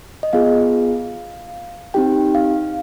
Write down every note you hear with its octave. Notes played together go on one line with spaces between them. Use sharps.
D#5
B3 F4 G#4 F5
C4 D#4 G4 G5
F5